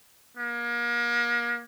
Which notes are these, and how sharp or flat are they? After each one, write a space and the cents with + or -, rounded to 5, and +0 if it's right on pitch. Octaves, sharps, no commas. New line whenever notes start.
A#3 +35